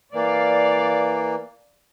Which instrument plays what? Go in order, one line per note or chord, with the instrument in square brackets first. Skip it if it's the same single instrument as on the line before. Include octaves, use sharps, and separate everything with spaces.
[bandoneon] E3 A#3 [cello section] D5 F5